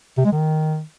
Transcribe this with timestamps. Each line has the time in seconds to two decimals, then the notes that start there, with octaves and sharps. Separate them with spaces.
0.18 C3
0.25 G#3
0.32 D#3